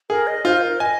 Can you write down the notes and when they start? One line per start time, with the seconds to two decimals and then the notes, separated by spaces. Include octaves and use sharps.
0.10 G#4 A#4
0.27 D#5
0.45 F4 C5
0.62 A#4
0.79 D#5 G#5